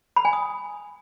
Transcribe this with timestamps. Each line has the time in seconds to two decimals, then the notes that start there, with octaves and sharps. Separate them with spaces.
0.16 B5
0.25 G#5
0.33 D#6